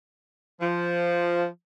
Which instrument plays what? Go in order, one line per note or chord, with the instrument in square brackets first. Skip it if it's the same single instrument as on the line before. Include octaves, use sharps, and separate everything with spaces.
[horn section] F3